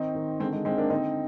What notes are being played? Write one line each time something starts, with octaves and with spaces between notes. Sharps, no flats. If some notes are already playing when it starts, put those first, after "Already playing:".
Already playing: D#3 C4 D#4
D#3
D3 G#3 C4
G#3
D3 G#3 C4
A#3 D4
D3 C4 D#4